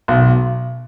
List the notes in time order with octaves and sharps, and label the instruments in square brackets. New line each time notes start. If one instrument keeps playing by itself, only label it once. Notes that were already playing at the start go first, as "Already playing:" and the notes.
[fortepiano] B1